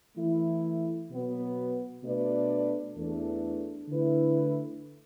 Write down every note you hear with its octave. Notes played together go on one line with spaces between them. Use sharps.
E3 A3 E4
B2 F#3 B3
B2 A3 D4 B4 D5
E2 E3 A3 D4 A4
D3 A3 E4 B4